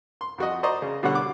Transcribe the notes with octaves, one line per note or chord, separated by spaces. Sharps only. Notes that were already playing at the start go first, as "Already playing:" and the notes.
C6
F2 F#4 D#5
C5 D5 D#5 A#5 C#6
C#3
B2 D3 G3 C#5 F#5
D6